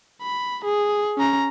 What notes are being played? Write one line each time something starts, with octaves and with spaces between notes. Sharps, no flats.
B5
G#4
C#4 A#5